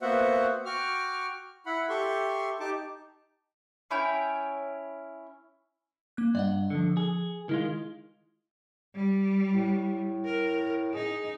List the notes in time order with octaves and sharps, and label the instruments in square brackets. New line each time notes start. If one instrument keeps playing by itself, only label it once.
[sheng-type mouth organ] A#3 B3 F#4 C5 E5 F#5
F#4 G5 C#6 D6 F6
E4 F#5 B5
G4 A4 E5 C6 C#6
D#4 G4 A5 D6
[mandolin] C#4 E4 C#5 G5
[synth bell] A#3 F#6
[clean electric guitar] G2 [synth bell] D5 D#5 F#5
[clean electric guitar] D3 [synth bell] F3 C#7
[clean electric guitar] G#4
[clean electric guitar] D#3 G#3 F4 [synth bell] E4 G7
[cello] G3
[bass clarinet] A2
[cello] A#4
[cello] D#4 [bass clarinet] G#4